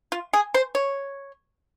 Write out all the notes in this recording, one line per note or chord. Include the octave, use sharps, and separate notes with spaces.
F4
G#4
C5
C#5